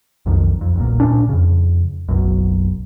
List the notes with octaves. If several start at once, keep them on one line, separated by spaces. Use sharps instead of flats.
B1 F2 D#3
F2
D#1 B1 A#2
D2 A#2 C#4 D4
F2 C#3
F#1 B1 F#2